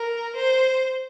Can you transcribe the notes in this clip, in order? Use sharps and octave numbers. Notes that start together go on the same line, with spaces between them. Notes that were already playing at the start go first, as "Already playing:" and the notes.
Already playing: A#4
C5